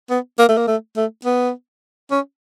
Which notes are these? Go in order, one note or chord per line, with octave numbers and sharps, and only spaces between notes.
B3
A#3
A3
A#3
A3
A3
B3
C#4